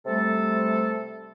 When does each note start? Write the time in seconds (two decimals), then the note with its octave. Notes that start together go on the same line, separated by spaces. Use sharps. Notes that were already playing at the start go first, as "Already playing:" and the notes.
0.06 C3 G3 A3 A4